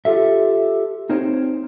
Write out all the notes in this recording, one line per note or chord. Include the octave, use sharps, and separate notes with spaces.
F4 G4 A4 E5
C4 D#4 A#4 C5 C#5 G5